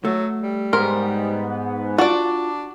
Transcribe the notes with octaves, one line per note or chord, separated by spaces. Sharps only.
F#3 A3
G3
G#2 B3 A#4 C6
D4 F4 F#4 D5